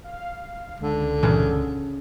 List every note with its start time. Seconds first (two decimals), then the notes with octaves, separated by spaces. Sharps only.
0.04 F5
0.80 C#2 D3
1.23 G2 A#2 C#3 E3